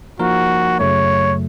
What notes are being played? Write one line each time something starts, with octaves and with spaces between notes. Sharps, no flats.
F3 A#3 D#4 F#4 A#4
F#2 C#3 F#3 A3 C#5